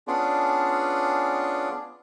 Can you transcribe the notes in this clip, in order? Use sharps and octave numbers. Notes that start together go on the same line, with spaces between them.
B3 C#4 D4 F4 G#4 D5